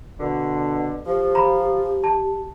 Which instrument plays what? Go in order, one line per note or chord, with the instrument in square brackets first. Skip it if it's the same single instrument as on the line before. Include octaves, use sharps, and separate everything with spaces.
[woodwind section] B2 D3
[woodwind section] F3 [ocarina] G4
[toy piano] A#5 B5
A5